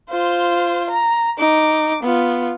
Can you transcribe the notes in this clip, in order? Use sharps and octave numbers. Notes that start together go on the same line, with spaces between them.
F4 C5
A#5
D#4 D6
B3 F4